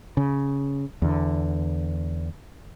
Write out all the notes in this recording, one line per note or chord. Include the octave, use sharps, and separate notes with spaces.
C#3
E2 D3